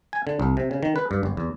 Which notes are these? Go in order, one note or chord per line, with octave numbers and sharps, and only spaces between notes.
G#5
D3
C2
C3
C#3
D#3
B4
G2
G1
E2